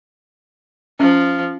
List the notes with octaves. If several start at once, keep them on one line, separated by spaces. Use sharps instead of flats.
F3 C#4